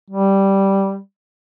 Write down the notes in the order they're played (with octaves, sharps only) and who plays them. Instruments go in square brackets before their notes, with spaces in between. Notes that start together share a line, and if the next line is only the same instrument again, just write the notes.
[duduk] G3